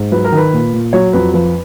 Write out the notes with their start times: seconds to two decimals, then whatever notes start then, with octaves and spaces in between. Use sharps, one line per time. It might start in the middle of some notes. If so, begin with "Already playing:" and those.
Already playing: G#2
0.12 F#3 B4
0.25 A#4
0.32 D#3 B4
0.53 A#2
0.74 A#2
0.93 F#3 C#5
1.13 F2 B4
1.34 F3 B4